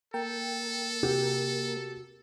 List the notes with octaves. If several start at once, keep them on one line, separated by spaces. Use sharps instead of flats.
A#3 A4 A#4 G5
C3 F#4 G4